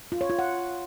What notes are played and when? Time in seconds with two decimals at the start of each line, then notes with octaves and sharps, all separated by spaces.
0.12 F4
0.21 C#5
0.30 F4
0.39 F#5